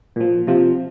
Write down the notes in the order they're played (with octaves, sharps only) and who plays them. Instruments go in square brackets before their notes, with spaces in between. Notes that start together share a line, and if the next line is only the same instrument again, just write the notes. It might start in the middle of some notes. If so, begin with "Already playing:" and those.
[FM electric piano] A#2 F3
C3 F3